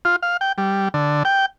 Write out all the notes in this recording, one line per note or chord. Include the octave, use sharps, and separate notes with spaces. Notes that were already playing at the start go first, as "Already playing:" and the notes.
F4
F5
G5
G3
D3
G5